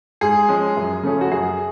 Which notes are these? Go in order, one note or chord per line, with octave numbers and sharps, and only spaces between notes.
G#2 G#4
F3 G#3 C#4
F#2
C#3 F3 A3 C#4
F#4
F#2 G#4